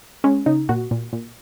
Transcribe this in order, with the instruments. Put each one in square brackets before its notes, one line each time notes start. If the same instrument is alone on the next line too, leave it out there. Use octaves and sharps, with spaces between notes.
[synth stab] G#3 C#4
C#3 D#4
A#2 F#4
A#2
A#2